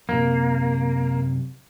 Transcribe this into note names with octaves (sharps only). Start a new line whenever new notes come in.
F#2 A2 C3 A#3